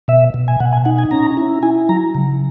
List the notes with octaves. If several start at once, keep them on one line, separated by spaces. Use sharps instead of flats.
B2 E5
B2
G#5
B2 F#5
G#5
D#4 F#5
G#5
C#4 A#5
E4
E4 G#5
F#3 A#5
C#3